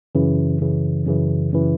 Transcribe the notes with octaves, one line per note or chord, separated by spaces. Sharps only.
F#2 C#3 E3
F#2 C#3 E3
F#2 C#3 E3
F#2 C#3 E3